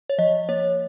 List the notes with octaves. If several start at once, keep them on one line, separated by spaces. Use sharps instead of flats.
C#5
F3 D#5
A#3 C#5